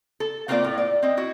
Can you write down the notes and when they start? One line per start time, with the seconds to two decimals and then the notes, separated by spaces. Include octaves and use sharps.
0.20 A4
0.48 A3 A#3 C4 E4 F4 D5
0.64 A2
0.78 D5
1.03 C4 D#5
1.17 E4 F#4